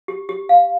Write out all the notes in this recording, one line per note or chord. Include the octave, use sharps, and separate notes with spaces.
G4
G4
F5